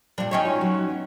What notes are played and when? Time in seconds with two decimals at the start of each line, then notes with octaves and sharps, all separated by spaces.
0.18 A#2 G3 D4
0.31 C#4 D#4 F#4 C#5 E5 G5
0.45 F4
0.61 F#3 F#4
0.88 B3